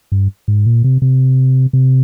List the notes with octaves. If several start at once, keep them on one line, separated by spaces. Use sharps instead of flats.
G2
G#2
A#2
C3
C3
C3